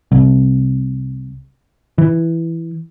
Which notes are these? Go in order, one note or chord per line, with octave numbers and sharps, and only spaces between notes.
C2
E3